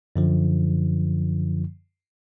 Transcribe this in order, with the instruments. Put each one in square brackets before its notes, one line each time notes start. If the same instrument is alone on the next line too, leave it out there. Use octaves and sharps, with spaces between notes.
[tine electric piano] F#2 D3 F3